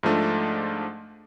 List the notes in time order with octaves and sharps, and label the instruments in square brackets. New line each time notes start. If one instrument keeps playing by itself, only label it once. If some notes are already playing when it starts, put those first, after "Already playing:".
[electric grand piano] G#2 F3 A3 D4